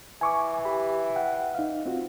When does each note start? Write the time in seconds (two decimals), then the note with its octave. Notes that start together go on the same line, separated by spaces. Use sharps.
0.21 E3 G#5 C#6 D6
0.65 G4 B5
1.16 F#5 G5
1.55 D#4 F5
1.86 C4 F4 F#4